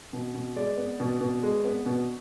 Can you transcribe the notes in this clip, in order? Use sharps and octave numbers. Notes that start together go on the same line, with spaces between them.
B2
B2
G#3 D5
B3
B2
B2
G#3
B3
B2